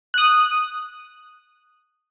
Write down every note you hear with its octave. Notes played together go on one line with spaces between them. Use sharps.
D#6 F#6